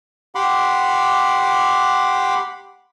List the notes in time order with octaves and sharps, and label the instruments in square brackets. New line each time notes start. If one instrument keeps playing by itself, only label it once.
[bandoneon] G4 F#5 B5 C6 D6